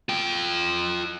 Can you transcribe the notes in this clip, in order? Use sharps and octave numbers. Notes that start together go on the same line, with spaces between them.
F4 G5